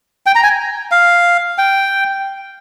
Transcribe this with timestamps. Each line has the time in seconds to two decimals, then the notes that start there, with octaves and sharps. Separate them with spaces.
0.26 G5
0.35 A#5
0.43 G#5
0.92 F5
1.58 G5